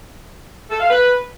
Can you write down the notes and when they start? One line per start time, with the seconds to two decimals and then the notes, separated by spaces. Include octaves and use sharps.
0.70 A4
0.80 F5
0.90 B4